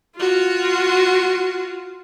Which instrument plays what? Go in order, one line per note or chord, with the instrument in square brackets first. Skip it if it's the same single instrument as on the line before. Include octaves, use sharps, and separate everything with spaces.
[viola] F4 F#4